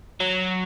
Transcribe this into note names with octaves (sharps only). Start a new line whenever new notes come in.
F#3